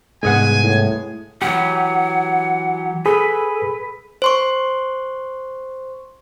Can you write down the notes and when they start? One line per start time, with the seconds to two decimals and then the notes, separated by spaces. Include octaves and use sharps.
0.23 C2 G#2 G#3 B3 G#4 F#5 G#5
0.63 A2
1.42 E3 F#3 G4 F#5
3.06 G#4 A4 B4
4.22 C5 C6 C#6